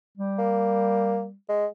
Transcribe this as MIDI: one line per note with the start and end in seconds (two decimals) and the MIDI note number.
0.18 1.34 55
0.38 1.24 58
1.49 1.66 56